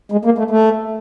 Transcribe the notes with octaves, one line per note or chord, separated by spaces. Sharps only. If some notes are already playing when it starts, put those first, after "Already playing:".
G#3
A#3
A3
A3